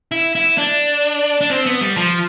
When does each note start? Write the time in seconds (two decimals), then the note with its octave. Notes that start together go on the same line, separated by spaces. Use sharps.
0.12 E4
0.35 E4
0.58 D4
1.41 D4
1.50 C4
1.66 B3
1.81 G3
1.97 F3